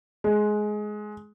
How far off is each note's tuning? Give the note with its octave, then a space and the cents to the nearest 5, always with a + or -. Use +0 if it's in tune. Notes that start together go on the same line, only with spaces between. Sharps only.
G#3 +15